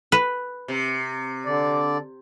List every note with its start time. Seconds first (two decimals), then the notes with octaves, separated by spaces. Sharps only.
0.12 B4
0.68 C3
1.45 D3 D5